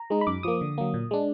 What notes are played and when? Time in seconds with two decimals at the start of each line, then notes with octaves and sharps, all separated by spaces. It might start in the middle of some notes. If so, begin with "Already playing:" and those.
Already playing: A#5
0.10 G#3 D#4
0.21 B5
0.27 F#2 D6
0.43 F3 A#3 D#6
0.61 D3
0.78 F#3 A#3
0.94 A#2
1.11 G#3 D4